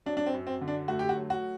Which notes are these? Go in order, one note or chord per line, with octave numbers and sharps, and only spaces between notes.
F#3 D4
D4
C4
F#2
C4
D3
D4
A3 F#4
G4
F#4
F#3
F#4